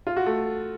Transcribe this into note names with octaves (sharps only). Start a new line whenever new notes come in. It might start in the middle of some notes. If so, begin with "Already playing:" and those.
F4
F#4
A3